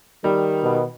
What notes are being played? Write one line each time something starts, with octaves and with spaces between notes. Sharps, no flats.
D#3 G3
B2